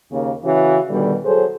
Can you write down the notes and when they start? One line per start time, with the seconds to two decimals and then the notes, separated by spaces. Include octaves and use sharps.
0.11 D#2 C#3 A#3
0.44 C#3 E3 F#4
0.87 B2 D3 D#3 G3
1.25 F#3 G#4 A4 C5